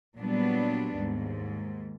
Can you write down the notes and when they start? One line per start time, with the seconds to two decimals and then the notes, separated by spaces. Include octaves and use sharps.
0.16 A#2 F#3 G3 B3 D4
0.96 D#2 G#2